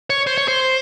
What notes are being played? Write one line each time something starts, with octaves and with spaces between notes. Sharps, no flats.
C#5
C5
C#5
C5